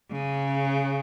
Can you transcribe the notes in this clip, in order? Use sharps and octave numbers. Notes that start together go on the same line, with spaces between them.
C#3